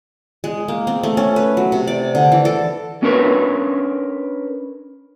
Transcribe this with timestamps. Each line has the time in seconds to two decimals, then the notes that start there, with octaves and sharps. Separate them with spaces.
0.44 G#3
0.68 A#3
0.87 C4
1.03 A3
1.17 C#4
1.36 B4
1.57 F#3
1.72 C3
1.87 D5
2.15 D3
2.32 E3
2.45 A4
3.03 C#4 D4 A#4 B4 C#5